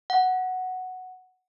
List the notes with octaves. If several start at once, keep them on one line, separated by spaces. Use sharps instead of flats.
F#5